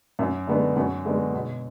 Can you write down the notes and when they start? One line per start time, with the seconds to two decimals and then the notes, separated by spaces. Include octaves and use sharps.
0.19 F#2
0.47 D3 G#3 B3
0.76 F#2 F#4 F#5
1.05 D3 G#3 B3
1.33 B2